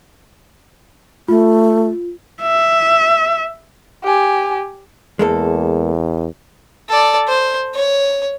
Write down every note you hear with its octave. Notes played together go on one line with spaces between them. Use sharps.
A3 F4
E5
G4 G#5
E2 G#3 A#3 A4
A4 D5
C5
C#5